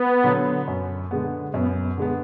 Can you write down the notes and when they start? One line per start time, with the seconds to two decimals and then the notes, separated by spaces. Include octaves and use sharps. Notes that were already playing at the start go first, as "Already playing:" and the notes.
Already playing: B3
0.24 D3 F#3
0.68 F#2
1.11 D3 G#3 B3
1.54 F#2 B3
1.98 D3 G#3 B3